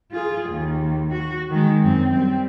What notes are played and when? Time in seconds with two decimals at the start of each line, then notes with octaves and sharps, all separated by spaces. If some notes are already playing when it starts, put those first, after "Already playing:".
0.11 F4 G#4
0.49 D#2
1.11 F#4
1.50 D#3 G#3
1.83 F#2 C4
2.13 G3 C4